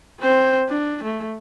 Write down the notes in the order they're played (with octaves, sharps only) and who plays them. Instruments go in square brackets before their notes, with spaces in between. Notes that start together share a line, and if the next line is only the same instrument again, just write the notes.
[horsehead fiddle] C4 C5
D4
A3